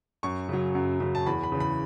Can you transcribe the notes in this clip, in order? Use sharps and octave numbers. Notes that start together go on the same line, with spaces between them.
F#2 C#6
C#3 F#3
F#2
C#3 F#3
A5
E2 B5
B5
C#3 E3
B5